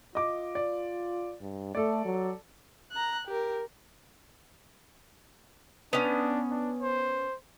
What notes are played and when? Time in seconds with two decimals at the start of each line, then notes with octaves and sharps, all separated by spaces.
0.15 F4 D#5 D6
0.55 D5
1.41 G2
1.75 A3 A4 D5
2.05 F#3
2.92 A#5 F#6
3.27 G4 A#4
5.93 B3 C#4 D4
6.51 D4
6.82 C5